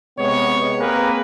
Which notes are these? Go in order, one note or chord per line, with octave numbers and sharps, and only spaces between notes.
C3 G#3 B3 C#5
A#3 C4 G#4 A#4 B4